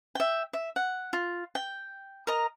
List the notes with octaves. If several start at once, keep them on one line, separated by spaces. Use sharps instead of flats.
E5 G5
E5
F#5
F4
G5
A#4 D#5 A#5